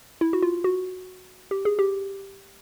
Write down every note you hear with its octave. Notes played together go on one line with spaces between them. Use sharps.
E4
F#4
F4
F#4
G4
G#4
G4